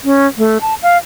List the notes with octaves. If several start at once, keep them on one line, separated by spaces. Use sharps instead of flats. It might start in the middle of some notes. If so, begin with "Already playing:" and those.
C#4
A3
A5
F5